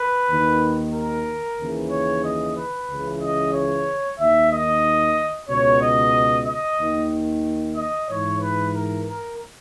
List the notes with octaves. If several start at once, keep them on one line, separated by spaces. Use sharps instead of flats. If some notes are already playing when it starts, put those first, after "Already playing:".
Already playing: B4
D#2 D#3
A#4
D#2 C#3 E3
C#5
D#5
B4
C#2 C#3 E3
D#5
C#5
D#2 D#3 E5
D#5
C#2 B2 C#5
D#5
D#5
D#2 D#3
D#5
G#2 E3 C#5
B4
A#4
A#4